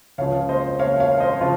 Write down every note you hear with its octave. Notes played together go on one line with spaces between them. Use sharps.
C#2 C#3 F3 C#5 F5
C5 D#5
C#5 F5
C#5 F5
C5 D#5
C#3 F3 F4